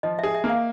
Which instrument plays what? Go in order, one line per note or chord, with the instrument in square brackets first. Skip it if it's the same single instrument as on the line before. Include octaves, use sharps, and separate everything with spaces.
[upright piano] F3 [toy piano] D#5
[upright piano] G#4 [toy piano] E5
[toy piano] E5
[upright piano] A#3
[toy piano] F5